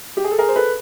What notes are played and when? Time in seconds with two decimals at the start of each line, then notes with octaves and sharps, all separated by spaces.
0.17 G4
0.24 G#4
0.31 A4
0.38 G#4 A#4
0.48 C5
0.56 A4 B4